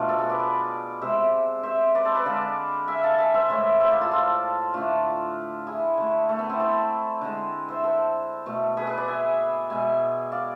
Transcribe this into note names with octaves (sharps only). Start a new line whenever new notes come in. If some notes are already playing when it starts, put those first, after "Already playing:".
Already playing: B2 A3 D4 F4 D5
A4 C5
G#4 B4
B4 D5
B4 D5
C3 G#3 C5 E5
C5 E5
B4 D5
A4 C5
B4 D5
D3 G#3 D5 F5
E5 G#5
F5 A5
E5 G#5
C5 E5
A2 E3 G#3
C5 E5
D5 F5
F4 A4
F4 A4
D3 A3 D4 F4
E4 G#4
D3 A3
A3
B3
C4 E4
A4 C5
D3 G#3
C5 E5
A4 C5
B2 A3
G#4 B4
G#4 B4
B4 D5
E5 G#5
B2 G#3 E5 G#5
D5 F5